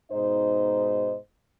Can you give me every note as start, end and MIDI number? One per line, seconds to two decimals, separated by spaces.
0.12 1.16 44
0.12 1.16 47
0.12 1.16 63
0.12 1.16 72
0.12 1.16 75